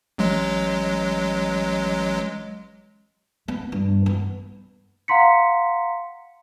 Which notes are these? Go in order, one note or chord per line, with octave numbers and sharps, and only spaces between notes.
A1 F#3 G#3
B3
G2
B3
F5 F#5 A#5 C6 B6 C#7